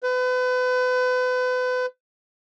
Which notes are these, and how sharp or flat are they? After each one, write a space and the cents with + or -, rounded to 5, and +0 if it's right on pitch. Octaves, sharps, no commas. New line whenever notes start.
B4 +35